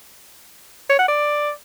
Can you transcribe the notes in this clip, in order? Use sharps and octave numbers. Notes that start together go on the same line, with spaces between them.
C#5
F#5
D5